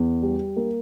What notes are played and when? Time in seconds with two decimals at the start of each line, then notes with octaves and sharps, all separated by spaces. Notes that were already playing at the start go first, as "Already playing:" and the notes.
Already playing: E2
0.22 G3
0.57 A#3